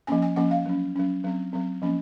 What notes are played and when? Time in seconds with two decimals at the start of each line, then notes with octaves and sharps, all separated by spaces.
0.07 F3 A#3 C#4 G#5
0.22 G#5
0.36 F3 A#3 C#4 F#5
0.51 F5
0.66 F#3 C#4
0.96 F#3 C#4
1.24 F#3 C4
1.53 F#3 C4
1.82 F3 A#3 C#4